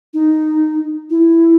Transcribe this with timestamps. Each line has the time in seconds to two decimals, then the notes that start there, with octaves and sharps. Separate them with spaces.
0.14 D#4
1.10 E4